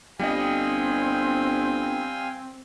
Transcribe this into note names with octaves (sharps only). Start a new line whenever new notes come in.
G1 G3 C4 D#5 F5 G5 G#5